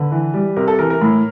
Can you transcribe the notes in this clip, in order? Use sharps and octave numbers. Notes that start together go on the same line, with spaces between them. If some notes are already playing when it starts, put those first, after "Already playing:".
Already playing: D3 B4
E3
G3
C3 A#4
A4
E3 A#4
A#4
A2